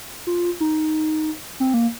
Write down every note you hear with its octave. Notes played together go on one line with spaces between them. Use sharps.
F4
D#4
C4
A#3